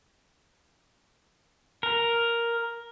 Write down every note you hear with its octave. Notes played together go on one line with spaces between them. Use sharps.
A#4